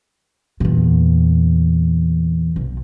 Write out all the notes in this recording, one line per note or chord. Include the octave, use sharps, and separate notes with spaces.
E2 A#2
B1